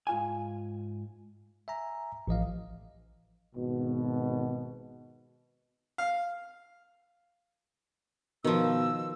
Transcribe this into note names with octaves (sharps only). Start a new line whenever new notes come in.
G#2 F4 G#5
E5 G#5 A#5
A1 F3 D#5 F5
G#1 B2
F5
B2 D#3 F3 E6